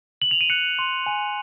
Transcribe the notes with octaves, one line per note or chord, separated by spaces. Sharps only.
F#7
F7
D#7
F#6 C#7
C6
G#5